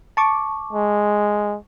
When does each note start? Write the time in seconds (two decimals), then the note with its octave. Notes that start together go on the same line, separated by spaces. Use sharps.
0.17 A5 C#6 D6
0.73 G#3